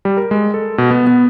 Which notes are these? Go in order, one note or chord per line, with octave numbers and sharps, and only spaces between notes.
G3
A#4
G#3
A4
B2
B3
B3